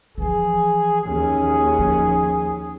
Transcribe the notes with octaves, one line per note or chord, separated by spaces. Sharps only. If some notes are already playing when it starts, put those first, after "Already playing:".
E3 F3 G#4
D#2 C#4 G#4
F3